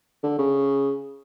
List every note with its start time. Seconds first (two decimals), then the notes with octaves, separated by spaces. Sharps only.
0.23 D3
0.39 C#3